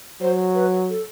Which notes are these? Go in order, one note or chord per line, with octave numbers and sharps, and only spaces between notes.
F#3 C5
B4
A4